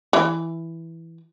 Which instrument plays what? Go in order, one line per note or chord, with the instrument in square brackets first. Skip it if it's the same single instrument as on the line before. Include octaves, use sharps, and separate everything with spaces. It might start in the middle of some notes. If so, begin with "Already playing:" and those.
[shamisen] E3